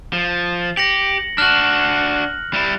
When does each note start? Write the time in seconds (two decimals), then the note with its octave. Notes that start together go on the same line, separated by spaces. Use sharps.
0.13 F3
0.77 G4 A#6 C#7 F#7
1.38 D4 F#4 F6 F#6 F#7
2.53 G3 E4